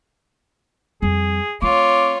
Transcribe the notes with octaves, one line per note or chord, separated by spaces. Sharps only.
F2 G3 G#4
A3 C4 F4 C#5 D6